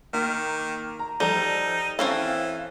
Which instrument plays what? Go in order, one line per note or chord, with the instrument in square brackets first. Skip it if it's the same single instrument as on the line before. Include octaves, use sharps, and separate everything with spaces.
[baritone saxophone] D#3 [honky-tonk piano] A#3
[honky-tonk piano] A#5
[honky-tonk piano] F3 A4 A#5 [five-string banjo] G3 [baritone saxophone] D#4
[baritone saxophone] E3 [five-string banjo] C4 C#4 A4 [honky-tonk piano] F5